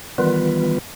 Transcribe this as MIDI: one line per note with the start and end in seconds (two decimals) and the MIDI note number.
0.18 0.79 51
0.18 0.79 52
0.18 0.79 55
0.18 0.79 59
0.18 0.79 65
0.18 0.79 71